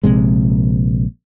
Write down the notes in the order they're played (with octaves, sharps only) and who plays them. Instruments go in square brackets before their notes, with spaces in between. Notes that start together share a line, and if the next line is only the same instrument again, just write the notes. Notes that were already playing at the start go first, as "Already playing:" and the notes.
[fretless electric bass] A#1 C3 G#3